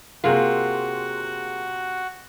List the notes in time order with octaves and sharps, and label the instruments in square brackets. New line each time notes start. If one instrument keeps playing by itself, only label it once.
[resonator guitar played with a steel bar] C3 F4 [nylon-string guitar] A#3 G#4 A#4 [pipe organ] F#4